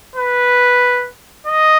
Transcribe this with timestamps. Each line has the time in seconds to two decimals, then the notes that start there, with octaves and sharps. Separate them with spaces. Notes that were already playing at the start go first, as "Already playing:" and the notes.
0.16 B4
1.47 D#5